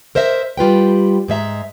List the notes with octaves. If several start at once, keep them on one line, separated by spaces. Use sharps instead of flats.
A#4 C5 D#5 E5
G3 F4 B4 G5
G#2 G#3 E5 A#5